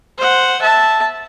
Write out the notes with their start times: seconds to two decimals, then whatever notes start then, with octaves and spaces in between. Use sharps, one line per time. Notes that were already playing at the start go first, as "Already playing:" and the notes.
0.18 C5 F#5
0.62 E5 A5